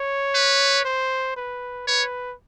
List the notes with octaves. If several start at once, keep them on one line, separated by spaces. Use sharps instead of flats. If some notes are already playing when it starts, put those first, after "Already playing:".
Already playing: C#5
B4
C5
B4
B4 C#5